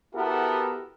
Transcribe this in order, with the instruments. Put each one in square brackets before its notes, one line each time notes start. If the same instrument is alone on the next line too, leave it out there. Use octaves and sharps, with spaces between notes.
[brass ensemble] B3 E4 F#4 G4 A4 A#4